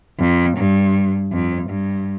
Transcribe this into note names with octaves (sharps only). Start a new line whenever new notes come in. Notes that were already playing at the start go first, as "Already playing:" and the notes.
F2
G2
F2
G2